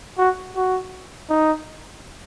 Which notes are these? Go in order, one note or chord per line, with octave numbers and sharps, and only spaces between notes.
F#4
F#4
D#4